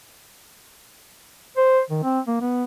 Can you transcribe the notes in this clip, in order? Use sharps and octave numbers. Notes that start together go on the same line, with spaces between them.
C5
D#3
C4
A#3
B3